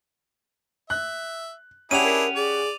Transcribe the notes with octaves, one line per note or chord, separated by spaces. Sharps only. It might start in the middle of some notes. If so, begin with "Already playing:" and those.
E5 F#6
C#4 D4 E4 G4 G#4 F#5 D#7 F7
A#4
G#4 D5